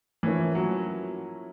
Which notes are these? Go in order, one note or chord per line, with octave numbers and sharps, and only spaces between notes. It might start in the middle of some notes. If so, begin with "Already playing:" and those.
A2 E3 F3 A#3 C#4 E4
F#3